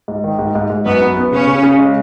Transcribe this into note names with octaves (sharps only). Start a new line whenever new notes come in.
G#2
D#3
G#2
G#2
G#2
F#2 B3
B3
B3
C#3 C#4
C#3
C#3
G#3